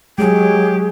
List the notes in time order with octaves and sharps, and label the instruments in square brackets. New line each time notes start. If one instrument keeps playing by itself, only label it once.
[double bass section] F#3 [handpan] G#3 [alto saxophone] G4 [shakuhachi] G#4